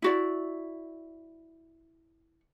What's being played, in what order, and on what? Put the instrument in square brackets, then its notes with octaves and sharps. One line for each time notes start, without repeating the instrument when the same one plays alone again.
[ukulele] E4 F#4 D5